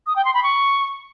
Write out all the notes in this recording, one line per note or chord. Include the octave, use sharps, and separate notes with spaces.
D#6
G5
C6
B5
C#6